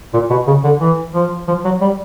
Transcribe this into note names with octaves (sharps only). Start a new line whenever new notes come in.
A#2
B2
C#3
D3
E3
F3
F3
F#3
G3